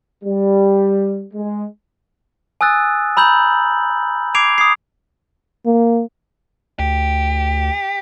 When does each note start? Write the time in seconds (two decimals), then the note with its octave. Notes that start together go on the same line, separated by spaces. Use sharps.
0.24 G3
1.34 G#3
2.61 G#5 D#6 E6 F#6 A6
3.17 A#5 B5 E6 G6 F#7
4.35 D6 G#6 C7 D7 F7
4.58 D#6 G#6 C7
5.66 A#3
6.79 D2 G4